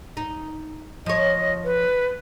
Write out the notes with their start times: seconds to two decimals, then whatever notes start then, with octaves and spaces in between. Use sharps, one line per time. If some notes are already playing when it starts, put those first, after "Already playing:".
0.17 D#4
1.06 F3 C#5 D#5
1.64 B4